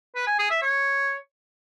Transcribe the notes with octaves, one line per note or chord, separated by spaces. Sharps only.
B4
G#5
G#4
E5
C#5